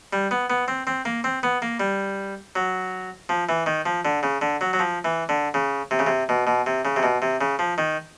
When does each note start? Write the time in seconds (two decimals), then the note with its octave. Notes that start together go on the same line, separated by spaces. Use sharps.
0.13 G3
0.31 B3
0.50 B3
0.68 C4
0.87 C4
1.05 A#3
1.24 C4
1.43 B3
1.62 A#3
1.80 G3
2.56 F#3
3.29 F3
3.49 E3
3.66 D#3
3.86 F3
4.05 D3
4.23 C#3
4.42 D3
4.61 F#3
4.73 F#3
4.79 F3
5.05 E3
5.29 D3
5.54 C#3
5.91 C3
5.99 C#3
6.07 C3
6.29 B2
6.47 B2
6.66 C3
6.85 C#3
6.96 C3
7.03 B2
7.22 C3
7.41 C#3
7.59 F3
7.78 D#3